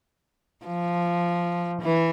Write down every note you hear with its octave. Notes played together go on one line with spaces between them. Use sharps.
F3
E3